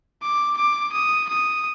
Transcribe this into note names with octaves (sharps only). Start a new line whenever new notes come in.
D6
D6
D#6
D#6